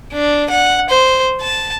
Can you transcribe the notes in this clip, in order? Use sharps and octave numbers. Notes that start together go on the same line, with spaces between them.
D4
F#5
C5
A5